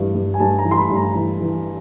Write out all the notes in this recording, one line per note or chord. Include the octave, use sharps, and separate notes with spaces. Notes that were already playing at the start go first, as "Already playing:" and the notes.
Already playing: G2 E3
G2
G#5
G2 A5
A#5
E3
C6
B5
G2
A#5
E3
E3